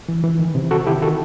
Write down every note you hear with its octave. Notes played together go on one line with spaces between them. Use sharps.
E3
E3
D#3
C3
C3 F#4 A4
D#3 E4 G4
D#3 F#4 A4